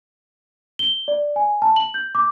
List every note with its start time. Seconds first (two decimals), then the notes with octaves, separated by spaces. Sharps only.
0.79 G7
1.08 D5
1.36 G#5
1.62 A5
1.76 F#7
1.94 G6
2.15 D6